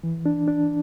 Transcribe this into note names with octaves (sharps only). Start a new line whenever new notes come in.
E3
D4
D4